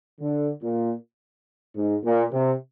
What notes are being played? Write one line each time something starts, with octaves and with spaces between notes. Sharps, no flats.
D3
A#2
G#2
A#2
C3